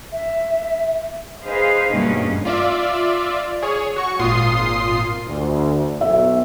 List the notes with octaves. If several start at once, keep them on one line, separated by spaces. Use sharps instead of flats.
E5
D#4 G#4 B4 C5 F5
G2 B2 D#3 A3 A#3 C#4
F4 D5 E5
G#4 C#5
F#4 C#6
G#1 A#2 F4 C6 D#6 C7
D2
B1 E5